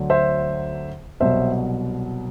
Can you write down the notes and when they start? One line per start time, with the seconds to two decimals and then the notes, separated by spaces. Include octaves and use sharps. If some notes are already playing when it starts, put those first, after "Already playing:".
Already playing: D2 D3 F#3
0.10 C5 E5
1.20 C2 B2 F#3 C5 E5